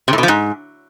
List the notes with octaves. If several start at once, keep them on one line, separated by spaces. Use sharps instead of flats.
C3
A2
B2
F3
G#2